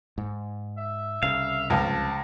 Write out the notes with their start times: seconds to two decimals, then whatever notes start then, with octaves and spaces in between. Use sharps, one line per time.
0.18 G#2
0.78 E5
1.23 C2 C#3 F5
1.70 C#2 F3 A5